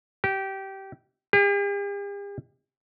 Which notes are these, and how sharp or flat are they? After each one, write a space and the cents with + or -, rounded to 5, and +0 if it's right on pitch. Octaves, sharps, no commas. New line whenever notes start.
G4 -20
G4 +45